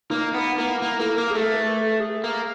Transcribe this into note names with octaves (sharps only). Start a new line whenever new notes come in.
A#3 D#4
B3 D#4
A#3 E4
A#3 E4
A#3 A4
A#3 A#4
G#4
A3 A4
B4
A4
G#4
A#3